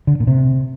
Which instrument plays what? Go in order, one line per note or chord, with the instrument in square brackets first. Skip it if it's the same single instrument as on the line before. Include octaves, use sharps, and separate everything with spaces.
[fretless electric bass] D3
A#2
C3